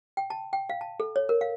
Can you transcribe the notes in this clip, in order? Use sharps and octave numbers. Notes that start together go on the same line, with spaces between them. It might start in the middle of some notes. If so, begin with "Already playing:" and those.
G5
A5
G5
F5
A5
A4
C#5
A#4
F5